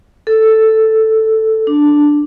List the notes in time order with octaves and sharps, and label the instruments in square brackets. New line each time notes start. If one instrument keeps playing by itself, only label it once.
[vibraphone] A4
D4